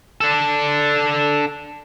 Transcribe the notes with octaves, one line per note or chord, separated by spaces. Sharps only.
D4 A4